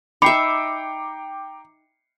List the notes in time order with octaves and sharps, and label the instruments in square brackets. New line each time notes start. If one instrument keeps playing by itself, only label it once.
[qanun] D#4 E5 [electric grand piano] G5 A#5 D6 [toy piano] B5 [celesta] C7 C#7